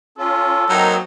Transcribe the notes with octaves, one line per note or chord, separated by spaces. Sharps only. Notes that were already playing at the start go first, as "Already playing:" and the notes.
C#4 F4 A4
F#3 A#3 C4 D#4